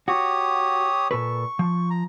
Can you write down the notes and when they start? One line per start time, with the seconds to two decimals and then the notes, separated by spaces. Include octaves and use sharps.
0.08 F#4 G4 C#5 D#6
1.11 A#2 A4 B4 C#6
1.59 F3
1.90 A#5